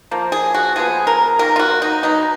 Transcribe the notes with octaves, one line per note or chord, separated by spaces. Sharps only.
F3 A#3
G#4
F#4
F3 G#3 B3 G#4
A#4
D#3 A#3 A#4
F4
F#4
D#4
B2 F#3 B3 D#4